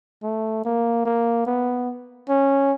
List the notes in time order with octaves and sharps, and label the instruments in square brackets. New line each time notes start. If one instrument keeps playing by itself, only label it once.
[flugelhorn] A3
A#3
A#3
B3
C#4